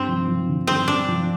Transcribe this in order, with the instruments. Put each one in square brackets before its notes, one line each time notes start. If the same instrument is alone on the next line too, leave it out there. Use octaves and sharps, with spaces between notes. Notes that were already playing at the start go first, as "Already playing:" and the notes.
Already playing: [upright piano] G2 [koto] C4
[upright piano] F3
F3
D3
[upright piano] G2 [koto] C4
[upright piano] G2 [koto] D4
[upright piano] F3